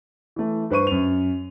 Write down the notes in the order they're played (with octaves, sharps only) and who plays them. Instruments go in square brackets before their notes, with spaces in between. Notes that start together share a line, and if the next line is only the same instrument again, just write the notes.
[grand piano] E3 A3
G2 B4 C5 C#6 D#7
F#2 F7